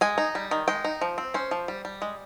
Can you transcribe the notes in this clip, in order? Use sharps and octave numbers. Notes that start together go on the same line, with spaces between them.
G#3 G#5
D#4
G3
D#3
G#3 G5
D#4
F3
C4
C#4 C5
F3
G3
G3
G#3